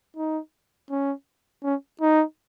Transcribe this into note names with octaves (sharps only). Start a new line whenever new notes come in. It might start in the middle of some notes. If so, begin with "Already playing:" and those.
D#4
C#4
C#4
D#4